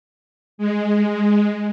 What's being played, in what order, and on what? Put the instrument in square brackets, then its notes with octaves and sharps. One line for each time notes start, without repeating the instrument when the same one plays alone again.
[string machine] G#3